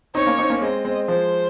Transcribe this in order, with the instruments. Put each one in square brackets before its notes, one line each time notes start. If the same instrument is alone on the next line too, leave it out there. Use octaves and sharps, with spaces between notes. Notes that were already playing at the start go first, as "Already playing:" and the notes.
[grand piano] C4 D#4 [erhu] C#5
[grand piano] A#3 C#4
C4 D#4
A#3 C#4
[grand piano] G#3 C4 [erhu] D#5
[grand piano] G#3 C4
[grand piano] F3 G#3 [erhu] C5